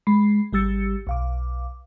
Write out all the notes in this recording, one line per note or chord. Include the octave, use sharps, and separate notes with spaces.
G#3 B5 C7
G#1 G3 G4 E6 A6 C#7
B1 F5 D6